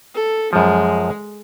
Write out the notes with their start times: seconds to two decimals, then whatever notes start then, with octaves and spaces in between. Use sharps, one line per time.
0.15 A4
0.53 F#2 F3 G#3